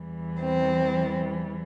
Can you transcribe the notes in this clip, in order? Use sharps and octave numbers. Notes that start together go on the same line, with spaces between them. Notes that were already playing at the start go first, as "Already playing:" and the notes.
Already playing: E2 E3 G3
C4